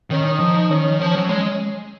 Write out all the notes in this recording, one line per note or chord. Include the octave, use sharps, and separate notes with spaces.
D#3 C#4
D#4
F3
D#3 C#4
F3
F#3
G#3